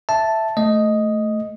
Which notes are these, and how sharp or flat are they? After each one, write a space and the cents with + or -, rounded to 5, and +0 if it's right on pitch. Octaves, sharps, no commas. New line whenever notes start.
E5 +0 A5 +0
A3 +0 D#5 +0